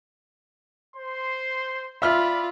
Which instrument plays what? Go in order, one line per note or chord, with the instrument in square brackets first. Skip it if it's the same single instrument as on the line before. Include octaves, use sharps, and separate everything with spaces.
[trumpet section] C5 C6
[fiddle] F4 [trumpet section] D5 B5 [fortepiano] E5 F6